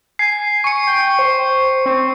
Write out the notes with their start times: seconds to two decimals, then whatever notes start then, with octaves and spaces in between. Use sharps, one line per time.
0.19 G#5 C7
0.64 C#6 C#7
0.87 G5
1.19 C5
1.86 C4